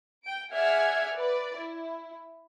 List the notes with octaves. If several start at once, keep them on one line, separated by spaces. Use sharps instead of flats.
G5 D7
G#4 D5 E5 F#5 F6 G#6
B4 D5
E4